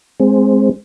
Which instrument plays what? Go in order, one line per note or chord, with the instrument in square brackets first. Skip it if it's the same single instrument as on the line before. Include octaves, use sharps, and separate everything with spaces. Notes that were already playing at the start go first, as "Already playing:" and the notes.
[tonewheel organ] G#3 C4